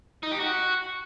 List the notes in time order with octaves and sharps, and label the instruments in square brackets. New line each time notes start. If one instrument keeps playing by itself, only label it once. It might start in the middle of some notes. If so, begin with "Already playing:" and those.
[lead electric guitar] D#4
G4
F#4